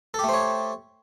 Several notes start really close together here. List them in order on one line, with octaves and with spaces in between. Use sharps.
A4 G4 A3 C5 C#5